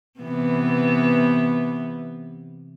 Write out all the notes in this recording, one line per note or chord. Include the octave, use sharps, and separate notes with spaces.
C3 E3 B3